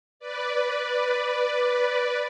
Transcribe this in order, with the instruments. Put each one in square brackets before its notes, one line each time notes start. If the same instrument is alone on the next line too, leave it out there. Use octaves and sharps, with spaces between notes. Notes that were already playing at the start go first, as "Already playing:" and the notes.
[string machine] B4 D5